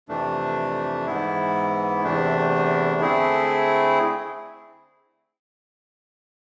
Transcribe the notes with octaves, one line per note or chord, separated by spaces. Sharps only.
F2 C3 E3 A3 D4
G#2 E3 B3 E4
E2 C3 E3 A3 D4
D3 A3 C4 E4 G#4